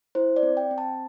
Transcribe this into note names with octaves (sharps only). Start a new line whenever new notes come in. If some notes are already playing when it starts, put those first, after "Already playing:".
E4 C5
D5
C4
G5
C4
A5